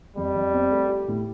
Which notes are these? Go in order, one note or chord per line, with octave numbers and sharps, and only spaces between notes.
F2 G3
F2
C4
A3
G4
A2